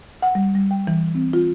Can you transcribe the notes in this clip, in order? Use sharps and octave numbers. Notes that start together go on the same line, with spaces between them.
F#5
G3
G3
G5
E3
C4
F4